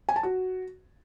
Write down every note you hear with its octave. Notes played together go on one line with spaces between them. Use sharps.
G#5
A5
F#4